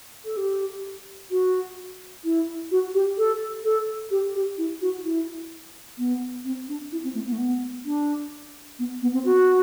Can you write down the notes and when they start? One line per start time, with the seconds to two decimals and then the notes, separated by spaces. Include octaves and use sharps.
0.25 A4
0.37 G4
1.31 F#4
2.25 E4
2.71 F#4
2.94 G4
3.18 A4
3.64 A4
4.11 G4
4.35 G4
4.58 E4
4.81 F#4
5.04 E4
5.98 B3
6.45 C4
6.68 D4
6.92 E4
7.04 C4
7.14 A3
7.26 B3
7.32 A3
7.38 B3
7.85 D4
8.79 B3
9.02 B3
9.14 C4
9.25 F#4